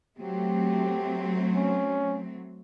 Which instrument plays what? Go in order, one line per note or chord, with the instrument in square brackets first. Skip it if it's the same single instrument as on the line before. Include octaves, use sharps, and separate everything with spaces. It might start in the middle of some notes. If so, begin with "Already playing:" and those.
[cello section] F#3 A3 C4 [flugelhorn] G4
[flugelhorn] C#4